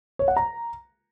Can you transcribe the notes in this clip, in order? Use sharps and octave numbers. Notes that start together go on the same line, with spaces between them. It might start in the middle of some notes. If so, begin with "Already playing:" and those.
C#5
F#5
A#5